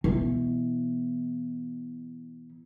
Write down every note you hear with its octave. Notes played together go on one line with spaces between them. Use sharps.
B2 E3